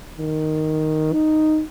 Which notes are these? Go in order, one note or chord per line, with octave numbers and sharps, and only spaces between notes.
D#3
D#4